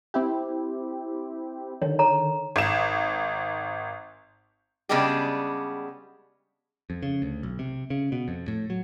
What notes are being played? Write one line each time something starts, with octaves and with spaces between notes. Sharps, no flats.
C4 E4 G4
D3 D#3 C#5
A4 C#5 A#5
G#1 E7
C#3 G3 G#3 B3 D4 G4
F2
C#3
D2
B1
C3
C#3
B2
F2
A2
F#3